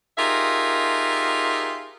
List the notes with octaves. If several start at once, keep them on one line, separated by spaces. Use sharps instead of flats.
D#4 F4 G4 G#4 A#4 E5